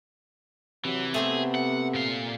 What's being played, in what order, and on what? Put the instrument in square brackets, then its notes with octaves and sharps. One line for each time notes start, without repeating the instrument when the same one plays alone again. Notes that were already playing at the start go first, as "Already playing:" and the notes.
[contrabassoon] C3 [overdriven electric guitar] E3 [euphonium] F#3
[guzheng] A3 C4 G4 [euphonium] B3 [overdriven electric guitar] G#4
[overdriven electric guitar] F#5
A#2 F5